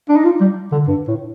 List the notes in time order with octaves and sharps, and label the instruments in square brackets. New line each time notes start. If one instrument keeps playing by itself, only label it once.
[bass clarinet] D4
D#4
F4
G3
D3
G2
A2